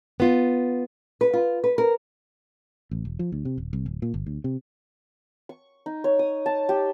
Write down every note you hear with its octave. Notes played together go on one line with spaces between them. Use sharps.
B3 F4
B4
F4
B4
A#4
A1
E1
F3
D2
C3
D#1
C2
D1
A#2
G1
D2
C3
C#6
D#4
C#5
D#6
A5
G4